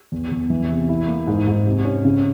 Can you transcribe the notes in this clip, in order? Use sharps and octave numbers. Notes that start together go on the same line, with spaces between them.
E2
E2
E3
C3
E4
A#3
G#2
G#2
C3
C#4
C#3